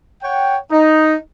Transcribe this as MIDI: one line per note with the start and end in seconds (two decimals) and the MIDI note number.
0.23 0.57 73
0.23 0.57 78
0.23 0.57 79
0.71 1.16 63